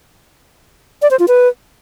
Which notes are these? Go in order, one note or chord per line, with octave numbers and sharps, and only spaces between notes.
D5
C5
F4
B4